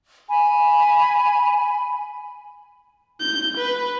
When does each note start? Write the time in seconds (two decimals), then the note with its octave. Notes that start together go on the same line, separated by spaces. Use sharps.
0.29 G#5 B5
3.20 G6
3.57 B4